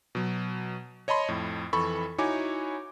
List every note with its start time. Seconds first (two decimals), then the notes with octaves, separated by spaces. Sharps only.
0.15 B2 F#3
1.08 C#5 D#5 A5 B5 C6
1.29 F2 A2
1.73 F2 E3 A4 B5 C#6
2.18 D#4 E4 F#4 C#5 G#5 D6